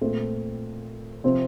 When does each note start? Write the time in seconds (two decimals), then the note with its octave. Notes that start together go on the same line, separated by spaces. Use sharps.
0.01 A#2 A3 C4 F4 A4
1.24 C3 F3 C4